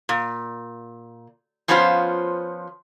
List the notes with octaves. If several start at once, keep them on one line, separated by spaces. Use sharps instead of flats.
A#2
F3 B3 C#4 F4 A#4 C5